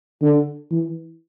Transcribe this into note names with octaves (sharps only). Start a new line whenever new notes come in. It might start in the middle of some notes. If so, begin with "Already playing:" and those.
D3
E3